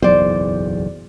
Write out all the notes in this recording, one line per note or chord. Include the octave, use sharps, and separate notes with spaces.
F#1 B1 E2 C5 D5